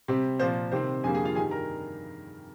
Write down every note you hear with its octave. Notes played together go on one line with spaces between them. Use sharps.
C3 G3 C4
A#2 F3 A#3 C5
C3 D#3 G3 C4 C5
F2 D3 G3 A#3 G#4 G#5
G#4 G#5
F4 F5
G2 D#3 G3 G#4 G#5
A#4 A#5